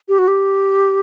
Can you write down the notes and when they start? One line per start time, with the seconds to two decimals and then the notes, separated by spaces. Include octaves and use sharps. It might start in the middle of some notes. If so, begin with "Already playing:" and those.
0.09 G4
0.19 F#4
0.28 G4